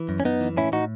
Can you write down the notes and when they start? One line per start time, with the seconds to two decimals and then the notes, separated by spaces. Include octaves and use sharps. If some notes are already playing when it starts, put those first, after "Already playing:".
Already playing: E3
0.09 F#2
0.20 C#4
0.25 F#2 B3 D#4
0.41 E3
0.57 A2 C#4 E4
0.72 A2 D#4 F#4